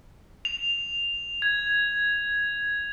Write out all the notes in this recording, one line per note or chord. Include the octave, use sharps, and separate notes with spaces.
F7
G#6